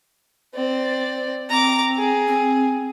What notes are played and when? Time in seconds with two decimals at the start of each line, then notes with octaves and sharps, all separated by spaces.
0.54 C4 D5
1.50 C4 A#5 D6
1.97 G#4
2.27 C4